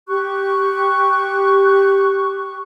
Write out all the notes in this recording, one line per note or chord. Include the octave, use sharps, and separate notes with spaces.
G4 C#6 F#6